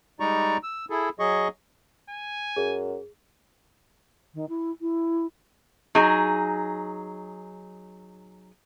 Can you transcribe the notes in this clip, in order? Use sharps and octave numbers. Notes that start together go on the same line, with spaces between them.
G3 G#3 D#4 D5 A#5 C#6
E6
E4 G#4 A4
F#3 G#4 D#5 C#6
G#5
F#2 G#4
D#3
E4
E4
F#3 D#4 G#4